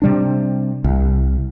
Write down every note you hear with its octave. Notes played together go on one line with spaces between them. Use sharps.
C3 G3 D4
C2